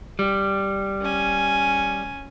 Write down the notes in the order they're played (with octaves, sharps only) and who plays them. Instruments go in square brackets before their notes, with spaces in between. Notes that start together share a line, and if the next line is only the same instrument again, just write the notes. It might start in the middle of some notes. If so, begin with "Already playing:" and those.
[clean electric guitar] G3
[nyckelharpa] C#4 G#5